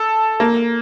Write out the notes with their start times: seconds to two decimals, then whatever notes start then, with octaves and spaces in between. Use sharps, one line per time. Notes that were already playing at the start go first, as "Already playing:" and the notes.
Already playing: A4
0.40 A#3